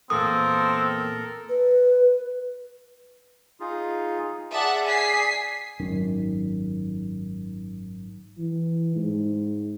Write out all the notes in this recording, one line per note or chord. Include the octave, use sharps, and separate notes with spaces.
E2 A#2 C4 A4 A#4 D#6
B4
D#4 F4 G#4
G#4 D5 E5 F#5 A5
G#5 B6 C7
G#1 F#2 D#3
E3
G#2